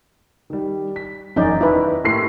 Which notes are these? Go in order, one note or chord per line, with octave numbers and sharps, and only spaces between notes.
D#3 G3
B6
E1 F#2 C#4 D#4 D5 G6
D#3 E4 B4
A2 A#3 G4 C6 C7